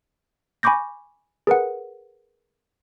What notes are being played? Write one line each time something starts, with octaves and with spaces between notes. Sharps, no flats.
G#5 B5 C#6 D6 G6 A#6
G#4 A#4 B4 F#5